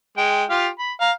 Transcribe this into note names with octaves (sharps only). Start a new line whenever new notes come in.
G#3 G5
F4 G4 F5
B5
F5 A#5